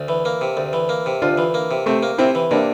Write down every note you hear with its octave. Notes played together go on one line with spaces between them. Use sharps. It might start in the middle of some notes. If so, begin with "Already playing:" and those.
Already playing: D2
E3
A#3
C3
D2
E3
A#3
C3
D2 D4 F4
E3
A#3
C3
C3 A3 C4
A#3
C3 C4 E4
E3
C3 A#3 D4